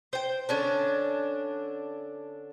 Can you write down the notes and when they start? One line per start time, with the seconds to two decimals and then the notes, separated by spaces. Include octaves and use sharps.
0.13 C5 G5
0.49 D3 C#4 D4